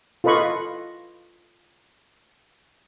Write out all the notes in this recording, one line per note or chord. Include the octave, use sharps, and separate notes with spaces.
F4 A4 B4 D#5 B5 C#6